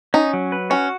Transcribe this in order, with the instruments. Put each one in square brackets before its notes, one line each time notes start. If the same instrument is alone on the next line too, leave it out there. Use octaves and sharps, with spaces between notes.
[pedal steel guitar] C#4 [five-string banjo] D#4
[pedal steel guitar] F#3
B4
[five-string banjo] C#4 [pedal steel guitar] F#4